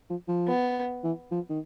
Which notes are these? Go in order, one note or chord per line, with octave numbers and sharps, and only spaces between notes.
F3
F3
B3
E3
F3
D#3